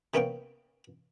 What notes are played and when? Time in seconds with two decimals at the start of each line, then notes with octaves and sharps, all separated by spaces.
0.14 C3 A#3 B3 C#4 F5 G5